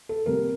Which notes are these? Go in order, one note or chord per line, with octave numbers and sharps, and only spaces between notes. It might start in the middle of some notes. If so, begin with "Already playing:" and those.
A4
F2 C3 G3 A#3 A#4